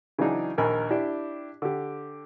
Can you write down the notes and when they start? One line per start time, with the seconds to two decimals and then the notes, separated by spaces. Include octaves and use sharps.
0.18 C#3 E3 F#3 D4 D#4 G#4
0.58 A#1 D#2 A#4 G#5 B5
0.91 D4 E4 G4
1.62 D3 G4